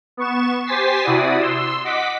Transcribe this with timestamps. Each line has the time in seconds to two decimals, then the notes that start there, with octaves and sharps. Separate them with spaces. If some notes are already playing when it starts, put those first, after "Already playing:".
0.17 B3 C#6 E7
0.66 G4 C5 G#5 A6 B6 C7
1.03 C3 E4 F#4 D5 D#6
1.40 C6 E6
1.84 D#5 F#5 D6 B6